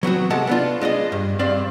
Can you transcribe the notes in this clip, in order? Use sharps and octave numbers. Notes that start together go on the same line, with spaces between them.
F#3 B3 C4 F#4
C3 G#3 A4 F#5 A5
B3 D4 F4
G#3 D4 D5 D#5
G2
G2 C4 D5 F5